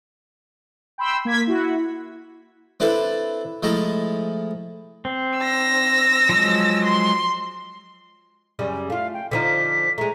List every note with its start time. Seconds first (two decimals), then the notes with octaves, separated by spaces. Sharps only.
0.98 G5 B5 C6 E6
1.25 A#3 G#6 B6
1.47 E4 F#4
2.80 C4 D4 E4 A4 B4
3.63 F3 G#3 A3 E4 A#5
5.05 C4
5.39 E6 A#6
6.29 F3 F#3 G#3
6.85 C6
8.59 F#2 C#3 G3
8.90 A3 F4 F5
9.14 G5
9.31 D3 F3 D#4 B6
9.98 G#3 A3 A#5